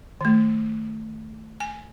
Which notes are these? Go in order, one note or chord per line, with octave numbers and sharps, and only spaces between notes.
D#3 A3
G#5